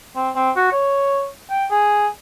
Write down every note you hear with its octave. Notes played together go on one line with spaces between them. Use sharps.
C4
C4
F#4
C#5
G5
G#4